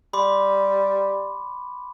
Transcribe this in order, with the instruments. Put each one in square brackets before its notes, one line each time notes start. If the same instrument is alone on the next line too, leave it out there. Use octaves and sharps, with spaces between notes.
[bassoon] G3 [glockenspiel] B5 C6 D6